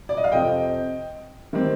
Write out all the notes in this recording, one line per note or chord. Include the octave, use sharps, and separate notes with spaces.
D5
D#5
F5
F2 C3 F3 C4 D#5 G5
D#3 G3 C4